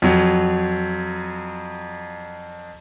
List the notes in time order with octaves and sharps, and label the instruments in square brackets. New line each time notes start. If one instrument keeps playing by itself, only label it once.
[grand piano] F2 F#3